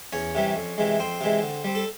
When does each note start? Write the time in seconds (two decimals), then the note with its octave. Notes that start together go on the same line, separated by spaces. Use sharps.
0.13 E2 C#4 C#5
0.35 C3 E3 G3
0.56 F2
0.78 C3 E3 G#3
0.99 F2 C4 C5
1.21 C3 E3 G#3
1.42 D3
1.64 G3 C4
1.75 A4